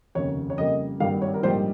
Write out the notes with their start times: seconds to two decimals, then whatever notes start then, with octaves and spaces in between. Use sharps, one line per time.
0.15 F1 D#2 C#3 C#5
0.50 C#5
0.57 F2 C#3 G3 A#3 D#5
1.00 G#1 G2 G3 A#3 F5
1.22 C#5
1.34 A#4
1.43 A#1 G#2 G3 A#3 C5